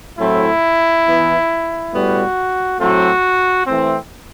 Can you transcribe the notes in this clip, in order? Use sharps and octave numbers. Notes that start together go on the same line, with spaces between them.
A2 F#3 A3 C4 E4
E3 B3
A2 G3 B3 F#4
A2 F#3 A3 C4 F#4
E3 A3 C4